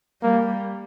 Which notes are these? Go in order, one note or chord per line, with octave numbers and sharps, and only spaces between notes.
G3 A#3